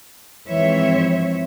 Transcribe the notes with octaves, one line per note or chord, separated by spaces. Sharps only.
G#2 E3 F3 C4 C#5 E5